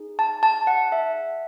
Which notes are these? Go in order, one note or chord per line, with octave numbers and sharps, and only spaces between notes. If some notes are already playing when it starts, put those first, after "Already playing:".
Already playing: D#4 G#4
A5
A5
F#5
E5